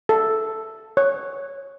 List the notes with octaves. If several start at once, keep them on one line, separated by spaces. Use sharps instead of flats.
A4
C#5